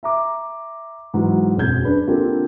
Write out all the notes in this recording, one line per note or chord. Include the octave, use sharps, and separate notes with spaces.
E5 A#5 D6
G#2 E3 F#3
E1 F#2 C4 G#4 G6 G#6
D4 B4
D3 A#3 C4 F4 G4 A4